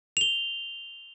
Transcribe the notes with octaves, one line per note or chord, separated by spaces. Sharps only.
F7 G7